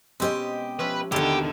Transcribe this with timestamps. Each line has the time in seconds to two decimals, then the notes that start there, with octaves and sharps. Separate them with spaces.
0.20 B2 G#3 C4 C#4 G4 D#5
0.79 F3 C#4 B4 E5
1.12 D#2 B2 D3 D#3 E4 F4 G4 F#5